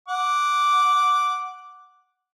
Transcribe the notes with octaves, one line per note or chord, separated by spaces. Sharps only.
F#5 D6